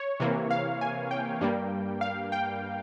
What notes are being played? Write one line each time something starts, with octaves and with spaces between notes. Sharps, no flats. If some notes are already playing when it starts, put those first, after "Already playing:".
Already playing: C#5
C3 E3 A#3
F5
G#5
G5
G2 G3 A#3
F5
G5